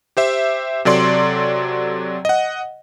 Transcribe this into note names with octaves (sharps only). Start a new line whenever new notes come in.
G4 C5 E5
C3 F#3 A4 D5 C6
D#5 F#5